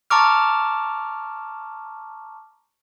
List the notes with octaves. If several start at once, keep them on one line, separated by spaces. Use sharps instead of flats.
A5 A#5 C#6 D6 F6